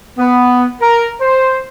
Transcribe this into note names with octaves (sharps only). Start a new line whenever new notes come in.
B3
A#4
C5